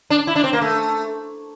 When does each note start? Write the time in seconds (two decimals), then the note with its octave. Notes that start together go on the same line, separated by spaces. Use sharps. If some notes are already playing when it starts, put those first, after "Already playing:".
0.10 D4
0.27 E4
0.36 D4
0.44 C4
0.53 A#3
0.62 A3